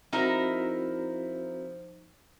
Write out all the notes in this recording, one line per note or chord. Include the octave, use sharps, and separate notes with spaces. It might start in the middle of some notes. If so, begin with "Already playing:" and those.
F3 C4 D#4 E4 F#4 A#4